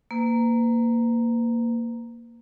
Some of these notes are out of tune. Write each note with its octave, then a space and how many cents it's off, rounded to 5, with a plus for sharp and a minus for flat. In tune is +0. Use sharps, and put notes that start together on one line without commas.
A#3 -5 B4 +40